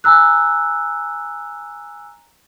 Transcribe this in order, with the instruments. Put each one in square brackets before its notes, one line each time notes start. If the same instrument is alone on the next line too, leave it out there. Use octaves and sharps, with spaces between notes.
[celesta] G#5 A#5 E6 F#6